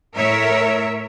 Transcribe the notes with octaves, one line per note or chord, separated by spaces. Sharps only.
A2 A#4 C#5 E5